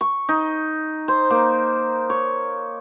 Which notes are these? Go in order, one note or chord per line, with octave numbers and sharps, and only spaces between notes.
C#6
D#4
C5
A#3
C#5